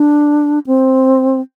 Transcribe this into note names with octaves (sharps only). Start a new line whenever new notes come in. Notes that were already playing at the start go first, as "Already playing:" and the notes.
Already playing: D4
C4